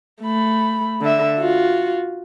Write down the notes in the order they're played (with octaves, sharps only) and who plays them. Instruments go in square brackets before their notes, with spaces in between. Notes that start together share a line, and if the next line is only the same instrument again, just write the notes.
[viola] A3 B5
D3 E5
F4 F#4